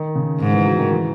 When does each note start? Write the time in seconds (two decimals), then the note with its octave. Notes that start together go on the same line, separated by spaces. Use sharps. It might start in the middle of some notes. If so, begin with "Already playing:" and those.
Already playing: D#3
0.15 C#3
0.40 G#2
0.52 E3
0.65 F#3
0.77 D#3
0.91 E3